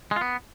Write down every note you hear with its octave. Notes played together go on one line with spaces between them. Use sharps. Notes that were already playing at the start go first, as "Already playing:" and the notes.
G#3
F4
B3